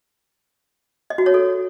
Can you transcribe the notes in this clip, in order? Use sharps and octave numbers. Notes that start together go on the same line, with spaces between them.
D#5
F#4
C#5
A4